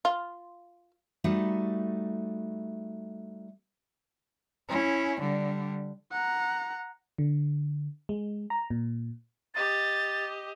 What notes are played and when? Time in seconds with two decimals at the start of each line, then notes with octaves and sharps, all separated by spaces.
0.05 F4
1.24 G3 A3 D#4 F#4 A4
4.69 C#4 E4
5.20 D3 G3
6.12 F#5 A#5
7.18 D3
8.09 G#3
8.50 A#5
8.70 A#2
9.54 G4 D#5 A6